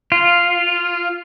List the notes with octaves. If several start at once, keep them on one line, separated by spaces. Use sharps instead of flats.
F4